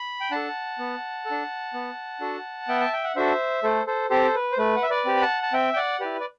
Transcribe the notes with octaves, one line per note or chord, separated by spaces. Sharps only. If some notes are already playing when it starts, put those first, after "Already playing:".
Already playing: B5
G5
D4 A4 F#5 A5
B3
A4
D4
B3
D4 F#4 A4
B3 E5 G5
A5
G5
F#5
D4 F#4 A4 C5 E5
A3 A4 C5
A4 C5
C4 G4 A4 C5
B4
C5
A3 B4
F#5
E5
B4 D5
C4 G4
B5
F#5 A5
A5
C4 E5 G5
G5
D5 F#5
E4 G4 B4 D5
D5